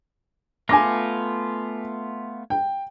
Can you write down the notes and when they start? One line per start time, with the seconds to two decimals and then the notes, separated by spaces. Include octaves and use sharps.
0.69 A3 B3 F4 G#5 D6 A#6
2.50 G5